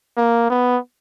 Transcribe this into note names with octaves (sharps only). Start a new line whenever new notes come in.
A#3
B3